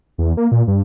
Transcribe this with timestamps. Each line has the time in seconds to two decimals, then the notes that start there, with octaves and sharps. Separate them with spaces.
0.18 E2
0.37 A#3
0.52 A#2
0.67 G2